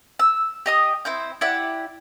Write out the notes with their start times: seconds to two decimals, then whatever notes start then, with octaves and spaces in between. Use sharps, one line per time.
0.19 E6
0.66 G4 D#5 D#6
1.05 C4 E4 C5 G6
1.41 E4 G4 D5 F#5